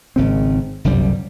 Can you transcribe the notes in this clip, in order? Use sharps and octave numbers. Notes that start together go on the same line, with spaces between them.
G#1 C#3 C4
G1 C2 F#2 G3